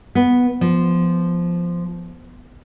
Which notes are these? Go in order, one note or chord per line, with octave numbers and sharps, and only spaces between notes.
B3
F3